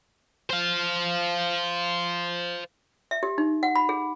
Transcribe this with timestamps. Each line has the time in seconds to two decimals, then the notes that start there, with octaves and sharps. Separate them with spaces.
0.50 C5 F5
3.11 E5
3.23 G4
3.38 D#4
3.63 F#5
3.76 B5
3.89 G#4